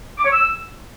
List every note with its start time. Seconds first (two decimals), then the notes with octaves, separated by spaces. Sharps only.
0.18 D6
0.25 C#5
0.32 E6